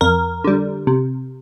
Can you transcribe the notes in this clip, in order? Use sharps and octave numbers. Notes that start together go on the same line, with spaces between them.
F2 A#4
D3 G3
C3